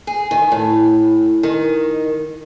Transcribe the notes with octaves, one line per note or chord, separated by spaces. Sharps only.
G#4
D#3
A2
D#3